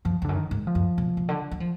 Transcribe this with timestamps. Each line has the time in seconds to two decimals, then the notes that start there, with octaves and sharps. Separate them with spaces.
0.05 F#2 F3
0.22 F2
0.25 F#2 D3
0.36 D#3
0.51 G#2
0.67 F3
0.75 F#2
0.98 B2
1.17 B2
1.29 D3
1.52 F#3
1.60 F3